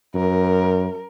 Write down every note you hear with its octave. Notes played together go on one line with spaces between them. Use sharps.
F#2 A#4